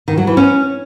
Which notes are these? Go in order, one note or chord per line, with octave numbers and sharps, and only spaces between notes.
D#3
F#3
E3
C#4